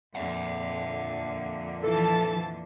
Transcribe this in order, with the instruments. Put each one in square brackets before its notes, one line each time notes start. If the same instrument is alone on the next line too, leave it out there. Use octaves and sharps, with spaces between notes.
[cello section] F2 A#2 D3 [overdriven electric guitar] E5 F#5
[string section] E3 F3 A5 [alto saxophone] A4